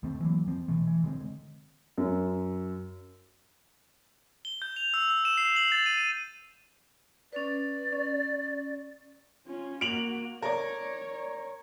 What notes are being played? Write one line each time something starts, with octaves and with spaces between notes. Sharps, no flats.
D2 D3 A3 C4
E3 F#3 A#3
F3 C4
B2 E3 A3
E3
D3 G#3 C4
F#2
G7
G6
F7
E6
E6
E7
C7
F#7
A6
D#7
D#7
C#4 B4 D5
C#4
C#4 F4
A#3 F#4 D7 F7 F#7
A#4 C#5 D5